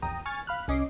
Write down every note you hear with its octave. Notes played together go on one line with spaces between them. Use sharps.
A#1 E2 G5 A#5 D#6
G#5 C#6 F6 G#6 A6
F5 B5 F6 F#6
C2 C#4 D#5 D6 C7